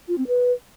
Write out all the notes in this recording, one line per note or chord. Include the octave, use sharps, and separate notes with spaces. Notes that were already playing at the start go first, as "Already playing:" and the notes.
F4
C4
B4